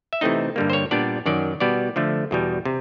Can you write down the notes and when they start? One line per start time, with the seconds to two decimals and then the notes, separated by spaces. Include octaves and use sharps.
0.13 E5
0.21 C3 E3 A3 C4 D#4 D#5
0.56 G2 D3 G3 A#3
0.70 C5
0.73 C#5
0.91 A#2 G3 B3 D4 D5
1.26 F#2 D#3 F#3 D5
1.60 B2 G3 B3 D5
1.96 D3 F3 A3
2.31 E2 B2 G3
2.65 C3